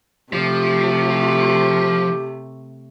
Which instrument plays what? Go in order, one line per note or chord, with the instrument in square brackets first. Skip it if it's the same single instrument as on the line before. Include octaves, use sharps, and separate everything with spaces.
[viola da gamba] C3 A3 [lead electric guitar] F3 [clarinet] G4